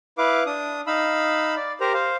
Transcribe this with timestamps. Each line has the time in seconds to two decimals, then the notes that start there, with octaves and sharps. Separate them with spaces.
0.18 E4 B4 F5 D6
0.46 D4 D#6
0.87 D#4 F5 B5 E6
1.56 D5
1.80 G4 A#4 C5 A#5
1.94 C5 F5